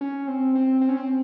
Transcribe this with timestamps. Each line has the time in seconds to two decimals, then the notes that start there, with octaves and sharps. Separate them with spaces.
0.01 C#4
0.28 C4
0.55 C4
0.81 C4
0.89 C#4
0.97 C4